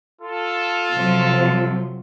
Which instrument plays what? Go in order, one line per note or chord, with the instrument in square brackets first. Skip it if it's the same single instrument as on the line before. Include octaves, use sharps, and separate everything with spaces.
[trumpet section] F4 A4
[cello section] C3 F3 F#3